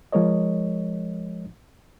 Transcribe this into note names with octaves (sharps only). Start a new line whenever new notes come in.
F3 G#3 A#4 C#5 D#5